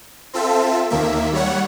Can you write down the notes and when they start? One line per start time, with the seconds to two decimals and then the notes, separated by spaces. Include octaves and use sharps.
0.33 C4 F4 A4 E5
0.90 D#2 D#3 A#3 E5
1.33 G3 C#5 F#5